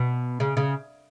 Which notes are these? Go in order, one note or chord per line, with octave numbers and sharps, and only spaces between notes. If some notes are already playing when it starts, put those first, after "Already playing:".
Already playing: B2
C#3
C#3